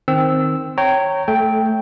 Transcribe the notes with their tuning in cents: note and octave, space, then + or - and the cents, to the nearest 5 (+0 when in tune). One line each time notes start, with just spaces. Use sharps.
D#3 +0 C4 +0 E6 -5
C#5 +0 G5 -20 A#5 -20
A3 +0 A4 -30 G5 +0